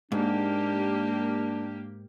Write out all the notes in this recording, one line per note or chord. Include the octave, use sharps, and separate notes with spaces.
G#2 A#3 D4 G4